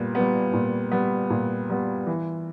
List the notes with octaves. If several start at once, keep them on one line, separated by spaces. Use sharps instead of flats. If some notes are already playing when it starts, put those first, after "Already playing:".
Already playing: A#2 G3 B3
G3 B3
A#2
G3 B3
A#2
G3 B3
E3